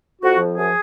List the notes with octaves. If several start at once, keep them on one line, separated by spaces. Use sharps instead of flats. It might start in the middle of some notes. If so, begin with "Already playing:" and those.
F2 F#4
F3
F#2 G#4